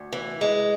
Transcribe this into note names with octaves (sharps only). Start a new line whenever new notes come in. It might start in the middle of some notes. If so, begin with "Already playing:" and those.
Already playing: D2
E3
G#3